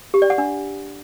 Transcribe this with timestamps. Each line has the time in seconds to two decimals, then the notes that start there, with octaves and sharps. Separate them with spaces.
0.14 G4
0.22 D5
0.30 F#5
0.38 D4